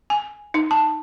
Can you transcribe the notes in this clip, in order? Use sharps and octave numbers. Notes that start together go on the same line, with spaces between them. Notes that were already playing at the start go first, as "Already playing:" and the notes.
G#5
D#4
A5